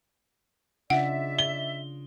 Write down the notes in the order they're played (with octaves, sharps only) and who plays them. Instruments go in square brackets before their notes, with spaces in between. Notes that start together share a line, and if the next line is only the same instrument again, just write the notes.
[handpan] C#3 D4 F4 [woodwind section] D#4 D5 E5 [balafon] F#5
[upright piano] G7